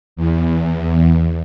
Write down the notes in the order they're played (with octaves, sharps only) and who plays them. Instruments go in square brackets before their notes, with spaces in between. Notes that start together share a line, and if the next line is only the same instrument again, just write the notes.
[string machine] E2